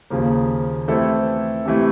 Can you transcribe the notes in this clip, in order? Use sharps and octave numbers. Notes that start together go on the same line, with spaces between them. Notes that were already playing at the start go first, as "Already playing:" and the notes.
D#2 C#3 F3 A#3
E3 A3 C4 E4 A4
C3 E3 A3